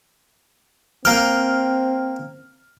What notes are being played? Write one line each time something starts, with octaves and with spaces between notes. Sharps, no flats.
A#3 C4 G5 F6